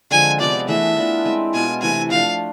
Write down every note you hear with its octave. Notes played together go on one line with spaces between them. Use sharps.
D3 F3 G#3 C4 G#5
C3 F3 B3 D5
E3 A3 D4 G#4 E5
E3 B3 D4 F4
G#3 C4 E4
B2 B3 F4 G#5
C3 E3 A3 E4 G#5
F3 A3 D4 F5